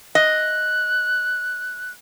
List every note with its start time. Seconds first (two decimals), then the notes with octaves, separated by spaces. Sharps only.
0.15 D#5 F#6